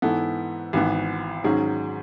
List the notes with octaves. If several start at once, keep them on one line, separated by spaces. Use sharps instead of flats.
G#2 E3 B3 E4 A4
G#1 G#2 E3 B3
G#2 D#3 F#3 C#4 G#4